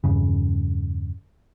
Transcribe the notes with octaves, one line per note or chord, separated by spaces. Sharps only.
E2 G2 C#3